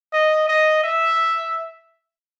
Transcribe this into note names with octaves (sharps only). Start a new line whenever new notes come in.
D#5
D#5
E5